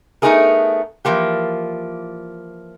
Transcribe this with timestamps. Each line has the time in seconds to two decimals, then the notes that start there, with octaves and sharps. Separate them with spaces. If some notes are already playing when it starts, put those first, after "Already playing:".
0.22 A3 B3 D#4 F4 G#4 A#4
1.05 E3 F3 A#3 G4